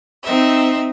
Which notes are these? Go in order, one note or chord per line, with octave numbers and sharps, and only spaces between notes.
C4 D#4 D#5 E5